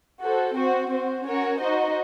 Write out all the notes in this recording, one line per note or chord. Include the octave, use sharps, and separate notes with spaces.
F#4 A4 C5
C4 F#4 C5
C4 F#4 C5
C#4 F#4 A#4 C#5
D#4 F#4 C5 D#5